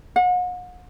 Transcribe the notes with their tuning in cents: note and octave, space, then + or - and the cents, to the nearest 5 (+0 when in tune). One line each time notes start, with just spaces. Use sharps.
F#5 -40